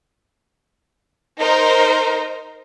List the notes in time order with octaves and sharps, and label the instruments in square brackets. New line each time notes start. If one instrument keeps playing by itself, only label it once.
[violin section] D#4 A#4 C5